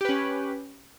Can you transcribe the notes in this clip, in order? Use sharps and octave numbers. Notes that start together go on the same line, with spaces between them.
C#4 G4 B4